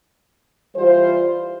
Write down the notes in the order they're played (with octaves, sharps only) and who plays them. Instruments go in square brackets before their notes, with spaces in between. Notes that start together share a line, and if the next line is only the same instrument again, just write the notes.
[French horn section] E3 G3 F4 C5